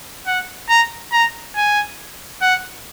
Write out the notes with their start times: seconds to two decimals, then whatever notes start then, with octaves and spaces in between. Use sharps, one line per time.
0.27 F#5
0.69 A#5
1.12 A#5
1.56 G#5
2.42 F#5